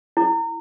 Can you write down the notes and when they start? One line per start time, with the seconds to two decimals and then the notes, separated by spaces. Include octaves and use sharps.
0.17 E4